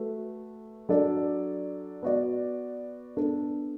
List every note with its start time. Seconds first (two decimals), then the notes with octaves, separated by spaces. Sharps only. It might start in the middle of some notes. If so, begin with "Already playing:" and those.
Already playing: A3 F#4 B4
0.89 F#3 D4 A4 D5
2.03 B3 F#4 D5
3.17 B3 D4 A4